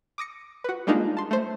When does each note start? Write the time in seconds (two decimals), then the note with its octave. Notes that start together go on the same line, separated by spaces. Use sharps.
0.18 D6 D#6 A#6 C#7
0.64 F#4 B4
0.87 G3 G#3 A#3 D4 D#4 F4
1.17 A5 C6
1.31 A3 C5